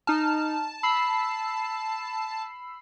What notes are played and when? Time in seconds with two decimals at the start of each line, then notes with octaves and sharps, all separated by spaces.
0.07 D#4 A5 F6
0.83 B5 E6 C7